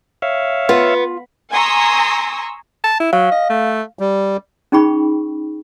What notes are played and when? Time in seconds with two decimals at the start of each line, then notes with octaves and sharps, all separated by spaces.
0.22 C#5 E5 F5
0.69 B3 F4
1.51 G#5 A#5 C6 C#6 D#6 E6
2.84 A5
3.00 E4
3.13 F#3 F5
3.31 D#5
3.50 A3
3.99 G3
4.72 C#4 D#4 G#4 G5 B5 C#6